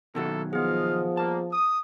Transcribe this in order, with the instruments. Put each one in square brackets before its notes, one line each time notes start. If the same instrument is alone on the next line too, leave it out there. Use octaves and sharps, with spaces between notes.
[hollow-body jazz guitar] B2 D#3 F#3 [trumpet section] A#3 E4 A4
[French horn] F3 [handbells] B3 G#4 [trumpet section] F4 D#5 F5
[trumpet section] G3 A#3 [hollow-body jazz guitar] A5
[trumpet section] D#6